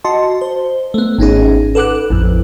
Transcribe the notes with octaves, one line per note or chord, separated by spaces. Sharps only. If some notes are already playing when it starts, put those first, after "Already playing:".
F#4 D#5 A5 C6
C5
A3 B3
G#1 C#4 D#4 G#4
A4 B4 F#5 D6 F#6
A1 F2